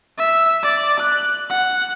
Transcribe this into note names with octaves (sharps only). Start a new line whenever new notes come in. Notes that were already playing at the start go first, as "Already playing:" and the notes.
E5
D5
F#6
F#5